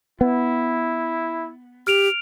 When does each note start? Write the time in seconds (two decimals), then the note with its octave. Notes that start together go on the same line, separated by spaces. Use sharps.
0.21 B3 E4
1.87 G4 F6 D7 F7